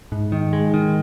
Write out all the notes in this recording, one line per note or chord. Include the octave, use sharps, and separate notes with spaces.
G#2
D#3
G#3
D#3